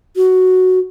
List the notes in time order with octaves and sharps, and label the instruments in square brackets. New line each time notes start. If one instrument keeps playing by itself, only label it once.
[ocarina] F#4